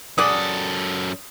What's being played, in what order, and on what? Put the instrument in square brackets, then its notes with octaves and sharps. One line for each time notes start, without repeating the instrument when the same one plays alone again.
[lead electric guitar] F#2 A4 [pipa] G#4 D5 F#5 [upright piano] D#6